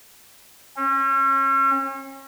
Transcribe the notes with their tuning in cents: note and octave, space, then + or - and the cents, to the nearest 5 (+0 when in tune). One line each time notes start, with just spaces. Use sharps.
C#4 -35